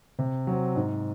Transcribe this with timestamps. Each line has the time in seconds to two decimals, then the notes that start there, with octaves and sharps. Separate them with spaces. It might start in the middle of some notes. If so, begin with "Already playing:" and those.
0.19 C3
0.47 F#3 C4
0.76 G#2